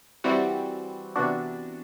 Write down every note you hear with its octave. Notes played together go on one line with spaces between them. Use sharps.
E3 G3 C4 F#4
C3 E3 B3 D4 F#4